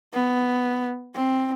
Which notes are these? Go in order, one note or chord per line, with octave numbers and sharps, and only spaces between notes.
B3
C4